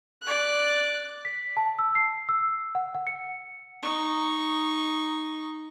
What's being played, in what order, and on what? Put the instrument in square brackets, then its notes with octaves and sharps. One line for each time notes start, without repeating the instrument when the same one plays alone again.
[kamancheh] D5 F#6
[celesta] B6
A5
E6
C7
E6
F#5
F#5
C#7
[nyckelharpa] D#4 C#6